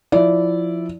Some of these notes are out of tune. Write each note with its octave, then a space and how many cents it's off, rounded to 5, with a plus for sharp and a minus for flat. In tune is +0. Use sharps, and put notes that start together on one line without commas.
F3 +5 E4 +0 D5 -15